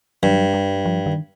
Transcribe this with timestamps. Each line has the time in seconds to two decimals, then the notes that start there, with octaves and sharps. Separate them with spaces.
0.23 G2 F#3
0.54 G3
0.85 F3
1.06 D#3